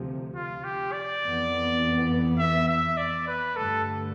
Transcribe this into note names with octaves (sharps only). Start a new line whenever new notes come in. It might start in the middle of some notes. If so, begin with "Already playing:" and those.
Already playing: D2 C3 F3
F4
G4
D5
F2 E3 B3
E5
E5
D5
B4
G2 D3 A3 A4